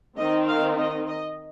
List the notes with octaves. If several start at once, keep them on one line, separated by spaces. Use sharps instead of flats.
D#3 C4 D#4 D#5
F5
D#5
D#5